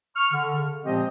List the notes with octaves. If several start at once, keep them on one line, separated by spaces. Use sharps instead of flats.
C#6 F6
D3
C#3
A#2 F3 G#3 C4 G4 D#5